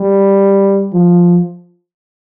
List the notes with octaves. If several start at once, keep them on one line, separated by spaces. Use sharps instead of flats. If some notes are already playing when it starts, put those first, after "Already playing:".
Already playing: G3
F3